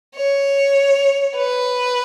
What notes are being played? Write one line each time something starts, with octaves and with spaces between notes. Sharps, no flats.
C#5
B4